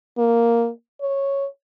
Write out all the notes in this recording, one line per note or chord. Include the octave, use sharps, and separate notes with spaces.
A#3
C#5